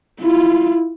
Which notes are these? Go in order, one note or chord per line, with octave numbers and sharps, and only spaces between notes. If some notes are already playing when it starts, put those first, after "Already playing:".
E4 F4